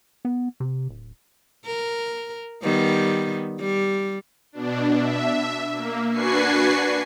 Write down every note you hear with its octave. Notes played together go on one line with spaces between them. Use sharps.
B3
C3
D1
A#4
D#3 G3 B3
G3
B2 D4
E5
A#3
D4 F#4 B4 G#5 C#6 C7